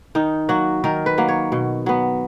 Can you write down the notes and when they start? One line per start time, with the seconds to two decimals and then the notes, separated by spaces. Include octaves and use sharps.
0.15 D#3 D#4
0.49 F#3 A#3 F#4
0.84 D#3 A#4
1.06 B4
1.18 F#3 A#3
1.28 C#5
1.52 B2
1.86 F#3 B3